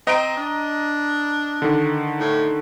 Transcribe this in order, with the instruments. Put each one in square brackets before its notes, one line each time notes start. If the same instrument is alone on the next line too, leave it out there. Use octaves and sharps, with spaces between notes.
[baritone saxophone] C4 [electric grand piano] D#5 A#5 D7
[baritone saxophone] D4
[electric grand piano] D3 D#3
[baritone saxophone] A2